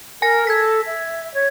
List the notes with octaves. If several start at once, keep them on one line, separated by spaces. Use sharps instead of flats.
A#4 G#5 A#6
A4 G#6 B6
E5
C#5